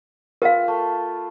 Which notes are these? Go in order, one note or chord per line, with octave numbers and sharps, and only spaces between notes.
F4 A#4 F5 G5 B5
A3